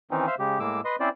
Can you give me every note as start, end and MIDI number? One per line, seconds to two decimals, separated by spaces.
0.11 0.26 51
0.11 0.26 52
0.11 0.26 60
0.11 0.26 61
0.11 0.26 63
0.27 0.35 72
0.27 0.35 76
0.27 0.35 77
0.39 0.59 49
0.39 0.59 56
0.39 0.59 67
0.60 0.81 45
0.60 0.81 56
0.60 0.81 58
0.60 0.81 86
0.60 0.81 88
0.85 0.96 71
0.85 0.96 75
0.85 0.96 84
0.85 0.96 87
1.00 1.09 60
1.00 1.09 61
1.00 1.09 64
1.00 1.09 72
1.00 1.09 74